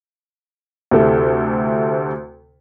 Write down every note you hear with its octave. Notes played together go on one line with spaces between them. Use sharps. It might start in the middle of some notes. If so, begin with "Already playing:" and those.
D2 C3 E4 A4